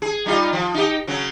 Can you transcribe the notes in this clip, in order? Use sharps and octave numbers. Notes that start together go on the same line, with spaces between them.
G#4
G3 D#4 F4
F3
D#4 G4
C#3 F#3 C#4